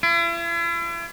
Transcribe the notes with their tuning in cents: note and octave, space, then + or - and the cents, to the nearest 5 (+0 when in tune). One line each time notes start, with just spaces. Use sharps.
E4 +45